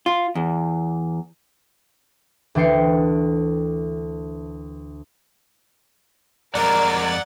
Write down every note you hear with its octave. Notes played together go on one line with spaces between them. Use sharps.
F4
E2
D2 E3 D4 G5 C7 C#7
F2 G#3 A#4 D5 F#5 A#5 A6